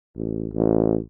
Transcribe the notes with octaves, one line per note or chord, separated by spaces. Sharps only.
A1
A1